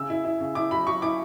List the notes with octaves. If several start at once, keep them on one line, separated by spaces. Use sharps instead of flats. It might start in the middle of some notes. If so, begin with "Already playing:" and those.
Already playing: C#3 E6
E4
E4
C#3
E4 D6
F#3 B5
F#3 C#6
E4 D6